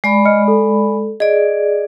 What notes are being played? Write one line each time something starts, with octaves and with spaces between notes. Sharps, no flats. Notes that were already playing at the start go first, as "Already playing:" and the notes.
G#3 D5 B5
D#5 F6 C#7
A4
G#4 D5 D#5